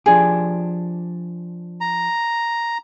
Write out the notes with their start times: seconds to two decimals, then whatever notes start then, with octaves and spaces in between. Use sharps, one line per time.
0.06 F3 D4 G4 G#4
1.81 A#5